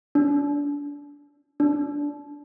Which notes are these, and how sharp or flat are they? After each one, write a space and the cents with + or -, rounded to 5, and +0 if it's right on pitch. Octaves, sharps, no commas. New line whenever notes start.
D4 -30
D4 -15